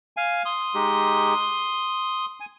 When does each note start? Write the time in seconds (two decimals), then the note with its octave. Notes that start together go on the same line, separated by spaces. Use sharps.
0.17 F5 G#5
0.45 C6 D#6
0.74 G#3 D#4 G4
2.40 G#5